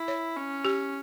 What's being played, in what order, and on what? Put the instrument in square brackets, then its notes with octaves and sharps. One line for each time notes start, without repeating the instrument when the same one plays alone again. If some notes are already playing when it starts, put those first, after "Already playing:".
Already playing: [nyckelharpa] E4
[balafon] C#5
[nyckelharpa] C#4
[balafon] G4